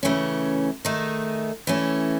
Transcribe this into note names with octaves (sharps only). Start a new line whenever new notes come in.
C#3 E3 A3 C#4
D#3 A3 D#4 G#4
E3 A3 C#4